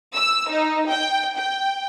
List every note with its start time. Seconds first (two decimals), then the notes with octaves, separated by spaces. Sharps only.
0.14 E6
0.49 D#4
0.89 G5
1.37 G5